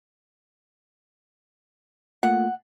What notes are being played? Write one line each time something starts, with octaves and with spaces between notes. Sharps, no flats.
A3 A#3 F4 F#5